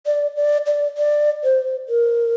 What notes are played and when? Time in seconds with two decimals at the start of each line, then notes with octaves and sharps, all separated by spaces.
0.06 D5
0.36 D5
0.66 D5
0.98 D5
1.44 C5
1.89 A#4